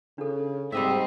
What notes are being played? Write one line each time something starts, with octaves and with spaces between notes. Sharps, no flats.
C#3 D4 A4
G#2 G3 C4 D#5 E5